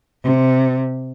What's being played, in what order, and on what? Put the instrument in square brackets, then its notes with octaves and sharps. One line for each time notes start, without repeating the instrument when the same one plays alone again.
[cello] C3